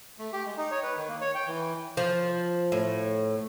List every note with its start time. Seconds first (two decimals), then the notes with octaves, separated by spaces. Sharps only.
0.19 A3
0.33 G4
0.46 G#3
0.57 D#4
0.71 C#5
0.83 B4
0.97 D#3
1.08 A#3
1.21 C#5
1.35 G5
1.48 E3
1.97 F3
2.72 A2